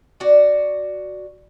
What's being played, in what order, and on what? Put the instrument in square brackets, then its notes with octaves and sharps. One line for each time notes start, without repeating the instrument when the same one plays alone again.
[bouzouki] F#4 D5